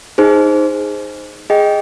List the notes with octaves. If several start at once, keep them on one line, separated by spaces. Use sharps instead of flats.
D#4 G#4 C5
G#4 D#5 G5